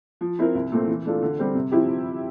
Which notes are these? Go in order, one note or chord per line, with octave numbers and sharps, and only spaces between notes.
F3
C4 E4 A#4
C2
A#2 A3 C4
E3
A3 D4 F4 A4
D3
G3 C4 G4 C5
C3
F3 C4 E4 G4